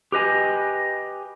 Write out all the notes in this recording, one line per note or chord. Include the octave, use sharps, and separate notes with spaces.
G4 B4 D#5 G#5